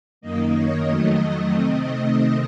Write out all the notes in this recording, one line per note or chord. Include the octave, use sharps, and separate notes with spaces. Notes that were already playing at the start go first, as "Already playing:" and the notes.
F#2 D#3 A#3 D#5
C#5
F2 D#3 F#3 A3 D#5
C3 D#3 A3 C4